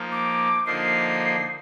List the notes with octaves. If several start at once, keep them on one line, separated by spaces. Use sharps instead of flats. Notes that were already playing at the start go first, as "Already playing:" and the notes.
Already playing: F3 A#3 D#4
D6
D3 F3 A#3 D#4 C7